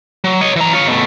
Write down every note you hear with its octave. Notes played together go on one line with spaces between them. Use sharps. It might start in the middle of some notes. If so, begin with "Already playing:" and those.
F#3
C#5 D#5
E3 A#5
F4 C#5
B2 A3